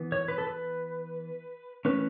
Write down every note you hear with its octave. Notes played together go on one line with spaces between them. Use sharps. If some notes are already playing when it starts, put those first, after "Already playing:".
Already playing: E3 B3
C#5
B4
A4
B4
E3 A3 C#4 B4